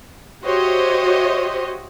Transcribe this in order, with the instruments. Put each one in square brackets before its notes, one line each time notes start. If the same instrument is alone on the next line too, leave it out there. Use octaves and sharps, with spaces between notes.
[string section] F#4 G4 C5 C#5 D#5 E5